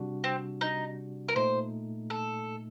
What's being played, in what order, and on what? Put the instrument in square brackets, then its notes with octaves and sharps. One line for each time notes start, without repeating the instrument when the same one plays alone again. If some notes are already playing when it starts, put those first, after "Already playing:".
Already playing: [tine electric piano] C3 G3 D4 F#4
[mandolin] C4
D#4
A#4
[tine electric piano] A#2 A3 D#4 [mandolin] C5
[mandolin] A4